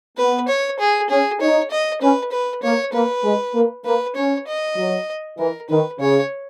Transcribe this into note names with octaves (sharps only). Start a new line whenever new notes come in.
B3 B4
C#5
G#4
C#4 G#4
D#4 C#5
D#5
C#4 B4
B4
A#3 C#5
A#3 B4
G#3
A#3
A#3 B4
C#4 C#5
D#5
F#3
E3 A#4
D#3 B4
C#3 C#5